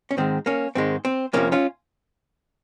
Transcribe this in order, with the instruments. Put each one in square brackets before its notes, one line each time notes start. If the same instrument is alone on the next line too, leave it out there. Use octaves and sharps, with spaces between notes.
[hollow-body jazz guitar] C#4
G#2 D#3 G#3 C4
A#3 C#4
G#2 D#3 G#3 C4
C4
F2 C3 F3 A#3 C#4
C#4 F4